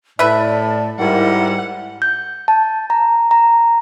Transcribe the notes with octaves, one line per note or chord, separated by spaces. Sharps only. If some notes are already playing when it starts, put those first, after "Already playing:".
A2 B4 D5 E5 A5
G#2 G3 E4 A#4 F#5
G6
A5
A#5
A#5